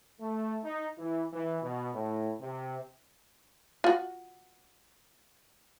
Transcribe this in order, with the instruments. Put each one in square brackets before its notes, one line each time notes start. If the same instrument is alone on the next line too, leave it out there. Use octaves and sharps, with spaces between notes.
[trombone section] A3
D#4
E3
E3
B2
A2
C3
[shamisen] F4 F#4